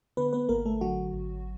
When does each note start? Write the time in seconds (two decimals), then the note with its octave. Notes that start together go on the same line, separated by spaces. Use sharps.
0.17 D3 B3 B4
0.33 B3 B4
0.49 G#1 A#3 A#4
0.65 A3 A4
0.81 D3 F#3 F#4
1.14 G#1